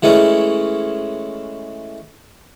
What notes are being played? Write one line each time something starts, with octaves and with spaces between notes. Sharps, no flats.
E3 G#3 A3 C#4 E4